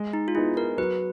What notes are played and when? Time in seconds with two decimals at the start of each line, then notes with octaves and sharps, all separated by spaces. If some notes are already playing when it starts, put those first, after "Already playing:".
Already playing: G#3
0.13 D#4
0.28 F4
0.35 B3 D#4 E4 G#4
0.57 A#4
0.78 F#3 B4